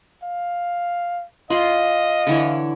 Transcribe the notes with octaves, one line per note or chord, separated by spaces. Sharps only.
F5
F4 D#5 F5 B5 C6
D3 E3 C#5